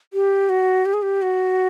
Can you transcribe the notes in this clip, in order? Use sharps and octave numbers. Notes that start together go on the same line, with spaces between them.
G4
F#4
G4
G#4
G4
F#4